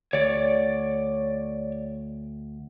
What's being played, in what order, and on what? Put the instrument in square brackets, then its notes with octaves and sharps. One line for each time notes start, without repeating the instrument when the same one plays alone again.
[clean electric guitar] D2 [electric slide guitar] C#5 D5